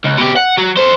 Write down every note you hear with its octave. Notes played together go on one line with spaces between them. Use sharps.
C#2
B2 G4
F#5
F#3
A4 C5